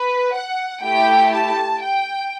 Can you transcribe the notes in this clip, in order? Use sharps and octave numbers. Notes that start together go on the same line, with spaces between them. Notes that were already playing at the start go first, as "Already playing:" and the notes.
Already playing: B4
F#5
A3 E4 G4 G5
A5
G5